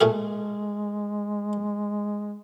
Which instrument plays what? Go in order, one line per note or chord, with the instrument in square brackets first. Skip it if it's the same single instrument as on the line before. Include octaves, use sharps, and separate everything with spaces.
[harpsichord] A#2 A3 G#4 [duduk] G#3